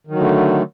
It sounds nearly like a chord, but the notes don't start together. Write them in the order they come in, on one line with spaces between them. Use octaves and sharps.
D#3 F#3 D3 A3